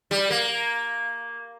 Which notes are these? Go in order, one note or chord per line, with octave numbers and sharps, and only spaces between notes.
G3
A#3